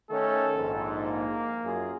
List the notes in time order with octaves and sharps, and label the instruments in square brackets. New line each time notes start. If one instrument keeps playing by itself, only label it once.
[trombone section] D#3 A3 C#4 [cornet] A4
[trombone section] A#1 G#2
[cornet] A#3
[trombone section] F#2 F4 G#4